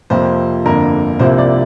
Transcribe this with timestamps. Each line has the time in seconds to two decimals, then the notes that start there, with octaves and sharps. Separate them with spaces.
0.10 F2 C3 F3 A#3 C5
0.65 G1 F2 D3 A#3 A#4
1.19 C2 C3 F3 A#3 C5
1.38 D5